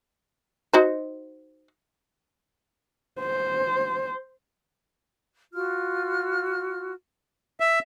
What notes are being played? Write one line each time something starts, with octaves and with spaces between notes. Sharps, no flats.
D#4 F#4 C5
C5
F4 F#4 F6
E5